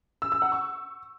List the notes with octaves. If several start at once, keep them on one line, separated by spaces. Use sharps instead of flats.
E6
E6
F#5
C#6